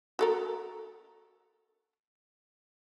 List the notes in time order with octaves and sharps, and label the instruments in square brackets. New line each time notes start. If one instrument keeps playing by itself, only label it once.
[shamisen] F#4 A4 A#4